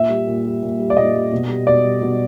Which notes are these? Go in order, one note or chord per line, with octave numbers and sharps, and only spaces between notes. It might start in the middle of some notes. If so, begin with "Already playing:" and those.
Already playing: A#2 E5
G3
A#2
G3
A#2
G3
D5
A#2 D#5
G3
B2
G3
B2 D5
G3
B2